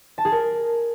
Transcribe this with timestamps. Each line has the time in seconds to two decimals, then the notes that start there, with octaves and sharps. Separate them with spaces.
0.18 A5
0.25 G#4
0.32 A#4